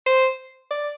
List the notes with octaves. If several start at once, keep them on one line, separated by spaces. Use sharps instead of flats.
C5
D5